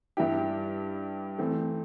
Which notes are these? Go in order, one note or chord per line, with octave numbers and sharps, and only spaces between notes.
G2 G3 E4 G4
E3 A3 C4